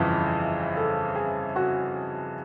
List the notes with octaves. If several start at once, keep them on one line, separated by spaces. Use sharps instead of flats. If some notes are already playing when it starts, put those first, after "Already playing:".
Already playing: G1 F2 C#3 E3 E4 F4
A4
G#4
F#4